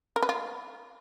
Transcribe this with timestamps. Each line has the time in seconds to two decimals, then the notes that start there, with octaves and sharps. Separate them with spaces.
0.16 A#4
0.23 B4
0.29 F4